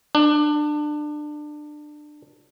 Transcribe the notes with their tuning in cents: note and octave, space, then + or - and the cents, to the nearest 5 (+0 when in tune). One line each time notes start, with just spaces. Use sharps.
D4 +25